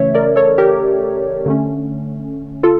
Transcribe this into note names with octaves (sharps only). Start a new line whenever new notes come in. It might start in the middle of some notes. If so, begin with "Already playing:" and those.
Already playing: C#3 E3 A3 C#4 C#5 E5
A#4 D5
A4 C#5
G4 A#4
D3 A3 C#4
F4 A4